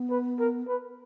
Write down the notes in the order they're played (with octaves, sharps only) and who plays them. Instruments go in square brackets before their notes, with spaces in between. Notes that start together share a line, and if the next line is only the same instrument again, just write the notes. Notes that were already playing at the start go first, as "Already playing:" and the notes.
Already playing: [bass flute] B3
[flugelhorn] B4
A#4
B4